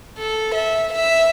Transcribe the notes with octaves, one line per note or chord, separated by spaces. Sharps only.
A4
E5
E5